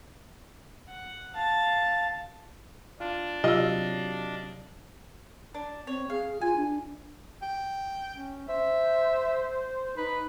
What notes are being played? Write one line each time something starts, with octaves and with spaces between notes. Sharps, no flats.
F#5
F5 A5
D4 F4
C3 F#3 D#4 F4 D#5 F5 E6
D4
C4 C#5
G#4 F5
F4 G#5
D4
G5
C#4
C5 E5
D#4 B4